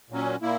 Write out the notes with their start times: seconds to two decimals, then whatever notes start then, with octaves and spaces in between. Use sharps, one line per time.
0.10 A#2 F#3 C#4
0.42 A#2 A#3 E4